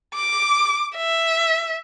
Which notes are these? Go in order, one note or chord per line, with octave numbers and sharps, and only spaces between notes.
D6
E5